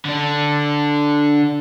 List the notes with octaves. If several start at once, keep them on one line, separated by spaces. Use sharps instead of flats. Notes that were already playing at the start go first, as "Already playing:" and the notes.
D3 D4